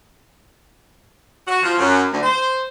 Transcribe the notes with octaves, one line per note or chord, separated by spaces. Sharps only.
F#4
F3
F#2
D2
C5